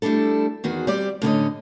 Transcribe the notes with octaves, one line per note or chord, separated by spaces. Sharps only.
G3 A3 D4 E4 A4
E2 D#3 F#4 G#4
G3 C4 G4 D5
A2 D3 C#4 D#5